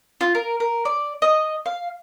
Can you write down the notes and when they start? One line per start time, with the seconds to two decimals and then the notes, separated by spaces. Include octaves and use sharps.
0.21 F4
0.35 A#4
0.60 A#4
0.85 D5
1.22 D#5
1.66 F5